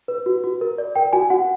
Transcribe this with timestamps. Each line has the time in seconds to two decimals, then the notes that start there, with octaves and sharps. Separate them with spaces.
0.08 B4
0.26 F#4
0.44 F#4
0.61 A#4
0.78 D5
0.96 A#4 G5
1.13 F#4 G#5
1.30 F#4 F#5